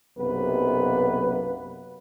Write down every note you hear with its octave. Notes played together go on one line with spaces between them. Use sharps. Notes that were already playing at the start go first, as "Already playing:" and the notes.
B1 F#2 C3 A#3 B3 B4